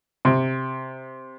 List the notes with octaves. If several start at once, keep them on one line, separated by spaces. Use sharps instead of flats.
C3